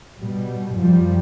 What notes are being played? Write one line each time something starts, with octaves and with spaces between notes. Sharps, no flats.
B2 G3
F#2 F3 G3